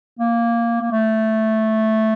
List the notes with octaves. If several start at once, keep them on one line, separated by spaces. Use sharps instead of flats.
A#3
A#3
A3